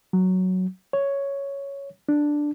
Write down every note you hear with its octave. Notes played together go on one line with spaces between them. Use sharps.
F#3
C#5
D4